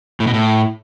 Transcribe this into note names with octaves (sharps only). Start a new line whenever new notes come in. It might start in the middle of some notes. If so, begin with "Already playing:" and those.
A2
B2
A2